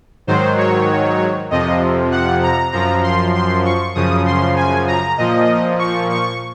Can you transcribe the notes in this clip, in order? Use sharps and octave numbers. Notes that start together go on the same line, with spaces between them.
G#2 D#3 F#3 C5
C#5
F2 C3 F3 D#5
F#5
A#5
F#2 F3 A#5
C6
C6
C#6
F#2 C#3 F3 D#6
C6
G#5
A#5
A#2 F3 D#5
C#6
C#6